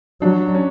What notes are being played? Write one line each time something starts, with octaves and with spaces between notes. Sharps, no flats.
F#3 D4
C#4